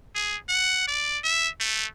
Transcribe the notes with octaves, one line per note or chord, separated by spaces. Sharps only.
G#4
F#5
D5
E5
A3